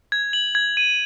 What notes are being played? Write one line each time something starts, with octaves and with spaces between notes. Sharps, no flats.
G#6
F#7
G#6
D#7